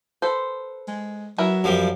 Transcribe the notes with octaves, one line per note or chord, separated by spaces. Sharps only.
A4 B4 C5
G#3
F#3 E4 A#4 B4
F#2 F3 G3